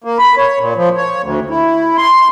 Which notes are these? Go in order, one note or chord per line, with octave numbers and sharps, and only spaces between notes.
A#3
B5
C#5
A#2
F3
C#5
D2
E4
C6